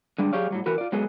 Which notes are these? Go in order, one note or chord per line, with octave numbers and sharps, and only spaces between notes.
D3 G3 G#3 D4
F#3 G4 G#4 C#5 D5 F5
A2 F#3 G3
E3 F#4 A#4 B4
F4 D5
F#3 G#3 B3 G#4 A4